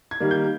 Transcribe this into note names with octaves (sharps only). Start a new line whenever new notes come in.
G#6
D#3 G3 A#3
G6